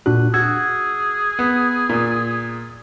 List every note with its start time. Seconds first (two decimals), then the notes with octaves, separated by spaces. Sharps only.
0.06 A#2 D4 F#4 F#6
0.34 F#4 G#4 E6 G#6
1.39 B3
1.89 A#2